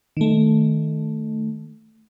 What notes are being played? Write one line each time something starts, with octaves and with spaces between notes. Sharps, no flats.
D#3 A3